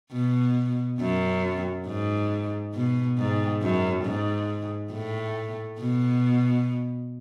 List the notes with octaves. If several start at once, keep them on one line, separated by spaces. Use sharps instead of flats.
B2
F#2
G#2
B2
G#2
F#2
G#2
A2
B2